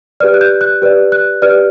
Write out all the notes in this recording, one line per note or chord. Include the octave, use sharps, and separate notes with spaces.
G4 B4 D5 F6
F#6
G6
F#6
G4 B4 D5
F#6
G4 B4 D5 F6